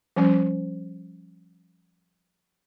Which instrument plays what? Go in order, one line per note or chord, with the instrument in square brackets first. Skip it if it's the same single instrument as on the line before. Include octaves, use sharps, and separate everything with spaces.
[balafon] F3 G3 C#4 C5